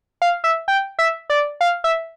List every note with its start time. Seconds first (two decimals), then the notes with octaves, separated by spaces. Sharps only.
0.22 F5
0.44 E5
0.68 G5
0.99 E5
1.30 D5
1.61 F5
1.84 E5